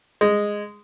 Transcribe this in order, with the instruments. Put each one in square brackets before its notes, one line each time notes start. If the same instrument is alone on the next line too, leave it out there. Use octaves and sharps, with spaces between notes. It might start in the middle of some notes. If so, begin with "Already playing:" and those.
[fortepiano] G#3